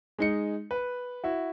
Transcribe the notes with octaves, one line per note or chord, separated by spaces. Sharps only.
G#3 D#4 C#7
B4
E4 F#4